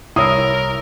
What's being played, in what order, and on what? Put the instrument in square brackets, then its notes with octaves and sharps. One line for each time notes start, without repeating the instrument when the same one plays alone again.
[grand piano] C2 C#5 E6 [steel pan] E4 [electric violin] A#4 [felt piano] D#6